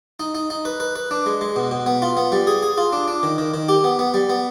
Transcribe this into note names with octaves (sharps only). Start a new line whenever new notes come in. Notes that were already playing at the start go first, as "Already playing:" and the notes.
D#4
D#4
D#4
B4
B4
B4
D4
G#3
G#3
B2
B2
B3
F4
B3
G3
G#4
G#4
F4
D4
D4
D#3
D#3
D#3
G4
B3
B3
G3
B3